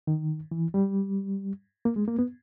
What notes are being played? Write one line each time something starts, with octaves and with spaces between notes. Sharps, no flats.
D#3
E3
G3
A#3
G#3
A#3
B3